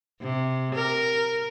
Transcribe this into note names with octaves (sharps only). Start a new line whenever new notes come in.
C3
A#4